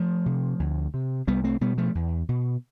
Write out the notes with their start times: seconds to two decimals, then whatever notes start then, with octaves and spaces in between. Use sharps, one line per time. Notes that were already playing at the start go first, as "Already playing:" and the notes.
Already playing: F3 A3
0.26 C3
0.60 D2
0.94 C3
1.28 C2 G3 B3
1.44 A3 C4
1.61 B2 G3 B3
1.78 F3 A3
1.95 E2
2.29 B2